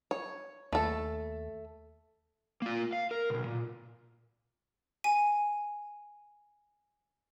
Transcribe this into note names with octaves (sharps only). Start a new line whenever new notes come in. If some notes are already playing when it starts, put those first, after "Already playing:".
C#5
D#2 A3 A4
A#3 F4
F5
A#4
B1 B2
A#2
G#5 D#7